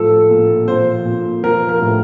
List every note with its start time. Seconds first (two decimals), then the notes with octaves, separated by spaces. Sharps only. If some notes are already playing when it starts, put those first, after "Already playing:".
Already playing: A2 F3 A4
0.30 A#2
0.68 F3 C5
1.05 A#2
1.43 F3 A#4
1.69 A#4
1.81 A2